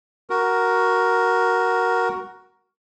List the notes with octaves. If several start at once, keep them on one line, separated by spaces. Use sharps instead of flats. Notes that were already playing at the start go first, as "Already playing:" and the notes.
F#4 A#4